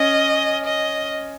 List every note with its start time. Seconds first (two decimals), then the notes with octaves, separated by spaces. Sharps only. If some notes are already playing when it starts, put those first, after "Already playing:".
Already playing: C#4 D#5
0.66 D#5